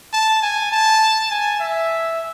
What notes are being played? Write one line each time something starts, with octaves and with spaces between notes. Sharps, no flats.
A5
G#5
A5
G#5
E5